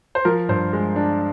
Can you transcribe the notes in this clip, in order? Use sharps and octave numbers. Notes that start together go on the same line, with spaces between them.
C5
F3 A#4
G2 C5
G#3
D4